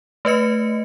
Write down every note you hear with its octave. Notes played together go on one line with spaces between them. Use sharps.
A3 B4 D#5 C#7